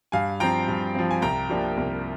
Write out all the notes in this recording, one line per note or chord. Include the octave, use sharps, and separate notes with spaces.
G2 F5 G#5
F3 C4 G5 A#5
G2
F3 C4
G#5
C2 G5 A#5
C3 F3 A#3 D4
C2